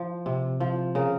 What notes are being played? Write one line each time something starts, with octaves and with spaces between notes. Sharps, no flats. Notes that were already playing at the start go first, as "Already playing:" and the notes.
Already playing: F3
C3
F3
C#3 A#4